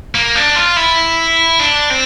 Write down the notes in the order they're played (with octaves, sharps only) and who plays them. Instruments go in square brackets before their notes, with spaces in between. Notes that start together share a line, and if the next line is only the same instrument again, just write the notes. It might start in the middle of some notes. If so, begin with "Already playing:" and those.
[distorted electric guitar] A#3
D4
F4
E4
D4
C4